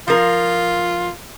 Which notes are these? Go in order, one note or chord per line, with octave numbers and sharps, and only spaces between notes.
F3 F4 A#4